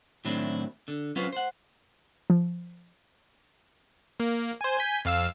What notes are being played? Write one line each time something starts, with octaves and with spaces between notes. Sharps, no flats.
A2 D#3 F#3 C4 D4 E4
D3
F#3 C#4 F4 B4 C5 F5
C5 F#5
F3
A#3
C5 G#5
G#5 G6 B6
F2 F5 E6